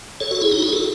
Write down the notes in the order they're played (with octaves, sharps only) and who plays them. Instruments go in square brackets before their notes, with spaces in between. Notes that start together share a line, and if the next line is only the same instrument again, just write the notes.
[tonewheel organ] A4 C#5
F#4 A4
E4 G#4
D#4 F#4
E4 G#4
F#4 A4